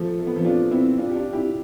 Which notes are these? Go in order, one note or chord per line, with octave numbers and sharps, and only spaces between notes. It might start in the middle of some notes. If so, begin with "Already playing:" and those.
Already playing: F3 A3
A3
B3
F3 A3
D4 F4
C4 E4
D4 F4
G4
D4 F4
E4 G4